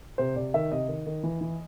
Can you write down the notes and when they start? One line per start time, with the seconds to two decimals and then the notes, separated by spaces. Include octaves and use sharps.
0.18 C3 C5
0.36 C3 D5
0.54 D#3 E5
0.72 C3 D#5
0.88 D#3
1.07 D#3
1.23 E3
1.41 E3